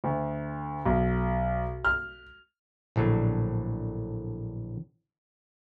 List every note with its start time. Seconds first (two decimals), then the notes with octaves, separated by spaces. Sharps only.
0.04 D2
0.86 B1
1.85 F6
2.96 A#1 A2 D3 F#3